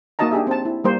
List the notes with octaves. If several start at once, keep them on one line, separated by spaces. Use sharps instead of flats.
A#3 D#4 F#4 D#5 A5 A#5
D4 G4 G#4 E5
C4 A5
E4
G3 A#3 C5